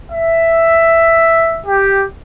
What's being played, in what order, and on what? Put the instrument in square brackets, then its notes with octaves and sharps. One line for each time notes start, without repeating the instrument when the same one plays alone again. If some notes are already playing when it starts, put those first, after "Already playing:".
[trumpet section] E5
G4